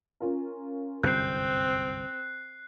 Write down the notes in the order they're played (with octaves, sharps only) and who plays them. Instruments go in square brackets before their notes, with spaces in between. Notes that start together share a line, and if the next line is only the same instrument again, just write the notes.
[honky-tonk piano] C#4 F4 A#4
[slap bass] G1 C2 F#2 [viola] C4 [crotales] F#6 C7 [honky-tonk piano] G6